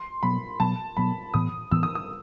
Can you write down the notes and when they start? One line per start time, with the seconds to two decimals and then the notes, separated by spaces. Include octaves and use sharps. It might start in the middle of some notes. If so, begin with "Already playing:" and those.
Already playing: C6
0.23 B2 F#3 B3 B5
0.60 B2 F#3 B3 A5
0.97 B2 F#3 B3 B5
1.34 A2 E3 B3 D#6
1.71 A2 E3 B3 E6
1.83 D#6
1.95 D#6